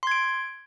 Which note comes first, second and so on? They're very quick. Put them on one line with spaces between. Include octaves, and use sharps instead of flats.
C6 G#6 D7